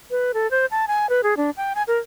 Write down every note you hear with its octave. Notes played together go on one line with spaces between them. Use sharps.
B4
A4
C5
A5
G#5
B4
G#4
D4
G5
G#5
A#4